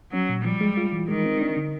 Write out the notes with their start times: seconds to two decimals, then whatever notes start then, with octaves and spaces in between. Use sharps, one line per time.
0.13 F#3 C#4
0.29 A#2
0.45 F3 G3
0.61 G#3
0.77 F4
0.92 E3
1.08 D#3 G#3
1.25 C4
1.41 D4
1.57 D3